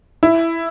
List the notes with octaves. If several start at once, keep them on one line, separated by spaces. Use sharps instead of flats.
E4